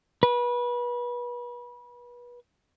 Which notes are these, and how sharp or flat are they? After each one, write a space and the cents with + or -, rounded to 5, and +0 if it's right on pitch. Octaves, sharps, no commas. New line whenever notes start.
B4 -30